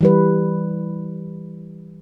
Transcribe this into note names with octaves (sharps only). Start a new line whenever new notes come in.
E3 G3 B4